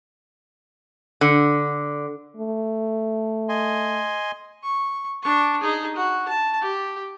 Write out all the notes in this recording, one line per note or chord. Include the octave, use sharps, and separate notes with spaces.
D3
A3
D#5 G#5 C6
C#6
D4 C#6
D#4 G#4
F#4
A5
G4